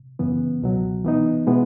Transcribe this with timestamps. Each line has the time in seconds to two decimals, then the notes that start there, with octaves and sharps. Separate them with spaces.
0.19 F#2 C#3 E3 B3
0.62 C#2 B2 F#3
1.05 E3 B3 D#4
1.47 B2 G#3 B3 E4